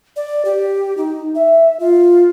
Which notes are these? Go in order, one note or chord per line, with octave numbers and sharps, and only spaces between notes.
D5
G4
D#4
E5
F4